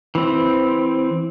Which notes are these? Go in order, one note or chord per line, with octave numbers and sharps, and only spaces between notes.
E3 C4